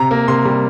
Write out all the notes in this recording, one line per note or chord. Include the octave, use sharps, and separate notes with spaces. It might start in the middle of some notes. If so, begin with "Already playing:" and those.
Already playing: C3 A#5
A#3
C3 C6
G3